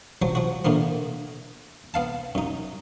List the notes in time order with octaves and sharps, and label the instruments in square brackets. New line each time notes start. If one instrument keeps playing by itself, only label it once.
[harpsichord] F3 F#3 C5
F3 F#4
A#2 D3 E3 A#3 B3
B3 F5 A5
F#2 D#4